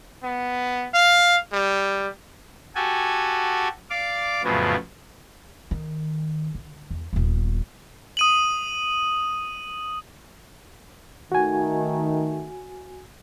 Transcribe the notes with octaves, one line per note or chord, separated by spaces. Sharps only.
B3
F5
G3
F#4 G4 A4 G#5
D5 F5 D6
F2 A2 C#3 F3 F#3 B3
D#3
D3
E2
D#1 B3
D#6 D#7 F#7
D#3 A3 F#4 G#5